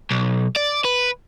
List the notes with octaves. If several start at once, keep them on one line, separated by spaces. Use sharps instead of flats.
B1
D5
B4